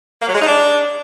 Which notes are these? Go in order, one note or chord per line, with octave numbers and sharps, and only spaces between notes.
A#3
F#3
G#3
D#4
D4